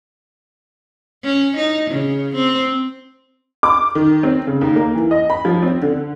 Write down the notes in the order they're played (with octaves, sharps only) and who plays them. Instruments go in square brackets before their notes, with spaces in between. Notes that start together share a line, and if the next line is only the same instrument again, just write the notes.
[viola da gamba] C#4
D#4
C#3
C4
[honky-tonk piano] D6
D#3
C4
C#3
D#2
A#3
E3
D#5
B5
F3
C4
D3